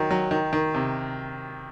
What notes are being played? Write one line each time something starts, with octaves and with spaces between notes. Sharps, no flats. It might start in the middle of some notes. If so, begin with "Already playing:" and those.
Already playing: D#3 F#3
F#3
D#3
D#3
C3